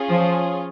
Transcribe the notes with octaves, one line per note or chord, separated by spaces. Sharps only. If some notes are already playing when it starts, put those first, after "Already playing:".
Already playing: C#4 F4 G#4
F3